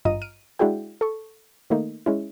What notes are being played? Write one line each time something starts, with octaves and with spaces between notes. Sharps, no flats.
G#1 G2 F4 D#5 A#5 D#7
F6 D7 D#7
G#3 D4 E4 F#4 G#4 G5
A4 C#6
D#3 A3 A#3 D#4
G#3 C#4 E4